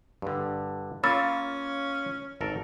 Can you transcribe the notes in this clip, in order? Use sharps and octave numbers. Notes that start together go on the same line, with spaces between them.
G2 D3
A#3 C#4 F4 B5 E6 A6
G#1 A4 A#4